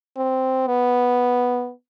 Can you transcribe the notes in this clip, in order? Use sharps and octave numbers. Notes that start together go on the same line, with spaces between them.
C4
B3